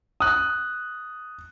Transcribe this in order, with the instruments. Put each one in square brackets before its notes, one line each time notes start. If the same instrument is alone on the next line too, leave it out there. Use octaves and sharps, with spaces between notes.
[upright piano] D#6 F#6